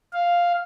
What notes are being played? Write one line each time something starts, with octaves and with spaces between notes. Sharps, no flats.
F5